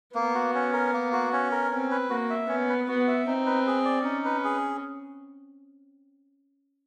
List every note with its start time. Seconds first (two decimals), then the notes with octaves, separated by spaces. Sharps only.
0.15 A#3 B3
0.35 F#4
0.54 C#4
0.73 A#4
0.93 A#3
1.13 F#4
1.32 C#4
1.51 A#4
1.71 C4 C#4
1.91 B4
2.10 A#3 F#4
2.30 E5
2.49 B3 C#4
2.69 B4
2.88 B3 F#4
3.08 E5
3.27 C4 D#4
3.46 B4
3.67 G#4
3.85 D5
4.05 C#4 D#4
4.25 B4
4.44 G#4